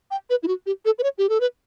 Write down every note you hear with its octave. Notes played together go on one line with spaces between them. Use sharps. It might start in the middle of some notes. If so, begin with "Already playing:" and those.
G5
B4
E4
F#4
G4
A4
B4
C#5
G4
A4
B4